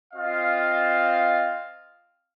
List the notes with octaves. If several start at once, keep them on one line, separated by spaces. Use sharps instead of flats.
C4 F4 D#5 F5